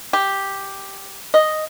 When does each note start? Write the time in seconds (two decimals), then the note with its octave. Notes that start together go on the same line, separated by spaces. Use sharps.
0.13 G4
1.34 D#5